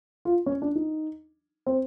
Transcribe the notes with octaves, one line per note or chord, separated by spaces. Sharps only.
F4
C#4
D4
D#4
C4